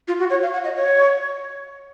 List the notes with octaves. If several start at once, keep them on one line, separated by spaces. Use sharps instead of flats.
F4
F#4
C#5
F5
F#5
D#5
C#5